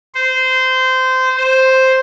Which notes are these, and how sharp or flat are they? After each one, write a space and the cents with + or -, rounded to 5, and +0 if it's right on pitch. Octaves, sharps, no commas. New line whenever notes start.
C5 -20
C5 +0